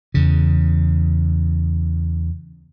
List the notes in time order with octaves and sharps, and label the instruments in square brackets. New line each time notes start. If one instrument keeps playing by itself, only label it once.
[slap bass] E2 C#3